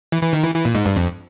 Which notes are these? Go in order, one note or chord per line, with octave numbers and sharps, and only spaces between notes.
E3
E3
D#3
E3
E3
A#2
G#2
G2
F2